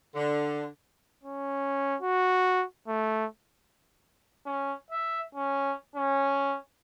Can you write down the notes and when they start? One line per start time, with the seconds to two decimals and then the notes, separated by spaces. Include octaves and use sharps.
0.15 D3
1.24 C#4
2.02 F#4
2.88 A3
4.46 C#4
4.91 E5
5.35 C#4
5.96 C#4